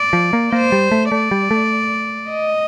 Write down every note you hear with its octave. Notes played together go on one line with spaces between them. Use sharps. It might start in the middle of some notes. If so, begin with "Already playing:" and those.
Already playing: D5
F3
A#3
A#3 C5
G3
A3
A3 D5
G3
A3
D#5